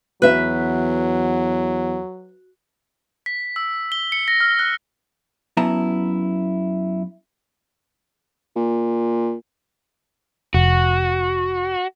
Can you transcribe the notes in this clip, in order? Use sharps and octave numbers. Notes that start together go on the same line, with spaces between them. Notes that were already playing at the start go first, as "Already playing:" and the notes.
E2 F#3 F#4 B4 E5 F#6
B6
E6
G7
C#7
A#6
F6
F#6
F#2 B3 E4 A5 A#5
A#2
F1 F#4